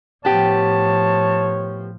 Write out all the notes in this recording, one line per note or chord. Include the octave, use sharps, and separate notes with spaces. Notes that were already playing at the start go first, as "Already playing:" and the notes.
A2 F3 B3 G4 C#5 A5